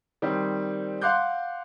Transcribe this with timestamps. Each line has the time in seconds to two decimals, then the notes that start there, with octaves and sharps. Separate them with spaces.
0.22 D#3 G3 C4
1.01 F5 F#5 C6 D6 F#6 G6